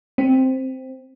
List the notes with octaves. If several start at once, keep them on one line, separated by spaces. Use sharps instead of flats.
C4